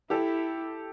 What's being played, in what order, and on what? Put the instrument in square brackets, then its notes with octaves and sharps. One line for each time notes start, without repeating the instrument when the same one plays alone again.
[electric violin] E4 [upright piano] G4 A4